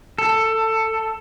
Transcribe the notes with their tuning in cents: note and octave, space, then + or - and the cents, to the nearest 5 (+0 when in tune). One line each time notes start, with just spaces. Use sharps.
A4 +15